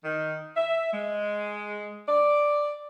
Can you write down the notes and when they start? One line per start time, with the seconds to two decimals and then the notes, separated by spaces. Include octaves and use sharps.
0.04 D#3
0.55 E5
0.92 G#3
2.07 D5